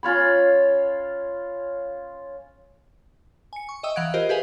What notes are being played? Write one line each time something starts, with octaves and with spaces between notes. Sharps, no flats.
C#4 F4 C#5 B5
G#5 C#7
C#6
D#5 E5 G5 D#6 E6
E3 F5 F#5 F#6 G#6 D7
F4 G4 A#4 C5 D#5
G4 G#4 B4 E5 F5 G#5